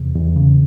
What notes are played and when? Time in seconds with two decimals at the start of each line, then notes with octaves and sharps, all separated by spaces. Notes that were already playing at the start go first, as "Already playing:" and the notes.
Already playing: E2 C3
0.15 E2
0.36 C#3